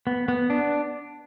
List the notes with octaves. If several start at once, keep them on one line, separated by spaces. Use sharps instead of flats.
B3
B3
D4